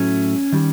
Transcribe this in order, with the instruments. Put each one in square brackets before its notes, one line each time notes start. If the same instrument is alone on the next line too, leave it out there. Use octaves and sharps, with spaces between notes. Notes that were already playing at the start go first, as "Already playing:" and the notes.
Already playing: [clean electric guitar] A2 F#3 A3 C#4
D#3 G3